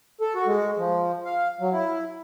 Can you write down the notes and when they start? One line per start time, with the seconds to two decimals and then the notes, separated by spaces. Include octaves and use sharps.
0.21 A4
0.35 F#4
0.47 G#3
0.78 F3
1.25 F5
1.61 F#3
1.72 E4